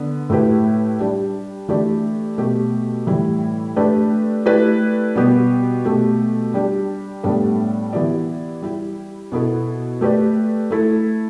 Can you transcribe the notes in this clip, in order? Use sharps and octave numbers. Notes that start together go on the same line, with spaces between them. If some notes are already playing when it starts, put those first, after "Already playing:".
Already playing: D3 B3
A2 A3 E4 G4 B4
G3 D4 G4
E3 A3 D4 G4 D5
B2 A3 G4
A2 E3 G3 E4
A3 D4 G4 B4 D5
A3 E4 G4 B4 D5
B2 G3 B3 G4
B2 A3 G4
G3 D4 G4
A2 G3 B3 D4 A4
E3 B3 E4 G4 D5
G3 E4 G4
B2 B3 E4 A4
A3 G4 B4 D5
A3 E4 A4